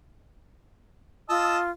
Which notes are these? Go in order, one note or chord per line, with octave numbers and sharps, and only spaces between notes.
F4 D#5 A5 E6